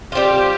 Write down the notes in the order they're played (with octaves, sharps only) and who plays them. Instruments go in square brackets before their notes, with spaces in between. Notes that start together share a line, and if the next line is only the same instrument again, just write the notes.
[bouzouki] G3 C4 F4 [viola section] G4